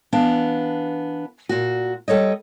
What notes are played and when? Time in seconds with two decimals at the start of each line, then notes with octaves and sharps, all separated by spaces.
0.13 E3 B3 D4 F5
1.49 A#2 F#4
2.08 G3 A4 C#5 D#5